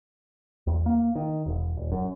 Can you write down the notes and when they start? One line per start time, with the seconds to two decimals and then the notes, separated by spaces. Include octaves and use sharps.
0.67 E2
0.86 A#3
1.15 D#3
1.46 E1
1.77 D#1
1.92 F#2